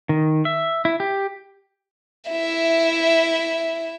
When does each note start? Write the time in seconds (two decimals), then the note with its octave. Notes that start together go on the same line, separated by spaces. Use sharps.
0.09 D#3
0.45 E5
0.85 E4
1.00 G4
2.30 E4 E5